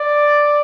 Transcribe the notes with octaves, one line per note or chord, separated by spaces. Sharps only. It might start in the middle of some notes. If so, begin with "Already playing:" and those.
Already playing: D5